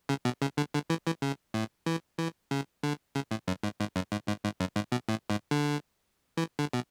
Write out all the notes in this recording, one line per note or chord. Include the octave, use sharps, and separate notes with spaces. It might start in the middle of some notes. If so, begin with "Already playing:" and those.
C#3
B2
C#3
D3
D3
E3
E3
C#3
A2
E3
E3
C#3
D3
C#3
A2
F#2
G#2
G#2
F#2
G#2
G#2
G#2
F#2
G#2
B2
A2
G#2
D3
E3
D3
B2